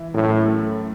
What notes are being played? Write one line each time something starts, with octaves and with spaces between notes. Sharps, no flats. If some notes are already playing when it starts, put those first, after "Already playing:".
Already playing: E3 E4
F#2 A2
A3